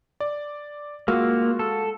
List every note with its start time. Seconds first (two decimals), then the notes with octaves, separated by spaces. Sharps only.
0.20 D5
1.08 G#3 A#3 F4 F#4 E6
1.59 A4